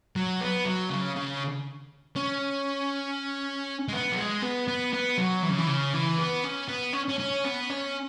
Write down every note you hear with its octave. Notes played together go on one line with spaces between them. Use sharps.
F#3
B3
F#3
C#3
C#3
C#4
G#3
B3
F#3
G#3
B3
B3
B3
F#3
E3
C#3
E3
C#3
E3
B3
C#4
B3
C#4
C#4
C#4
B3
C#4